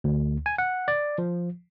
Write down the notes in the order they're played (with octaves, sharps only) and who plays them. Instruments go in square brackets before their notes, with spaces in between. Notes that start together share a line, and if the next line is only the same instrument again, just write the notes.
[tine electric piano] D2
G#5
F#5
D5
F3